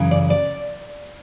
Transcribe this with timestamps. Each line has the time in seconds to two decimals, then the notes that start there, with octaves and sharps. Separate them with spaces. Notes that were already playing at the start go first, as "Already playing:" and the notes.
Already playing: F#2 C#3 E3
0.11 D5
0.30 D5